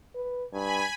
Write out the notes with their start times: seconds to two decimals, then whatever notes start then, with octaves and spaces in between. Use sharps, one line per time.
0.15 B4
0.53 G2 G#5 B5